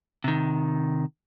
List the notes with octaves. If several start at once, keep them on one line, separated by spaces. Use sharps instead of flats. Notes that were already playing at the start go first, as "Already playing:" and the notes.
C3 D#3